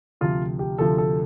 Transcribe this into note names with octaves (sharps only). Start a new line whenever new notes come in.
D2 C3 F3 F4
G4
D2 C3 F3 A4
A4